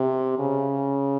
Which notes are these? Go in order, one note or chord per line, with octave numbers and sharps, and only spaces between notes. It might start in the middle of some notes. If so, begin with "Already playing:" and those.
Already playing: C3
C#3